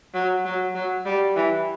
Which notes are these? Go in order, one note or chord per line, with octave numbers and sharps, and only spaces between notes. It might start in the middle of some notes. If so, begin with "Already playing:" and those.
F#3
F#3
F#3
G3
E3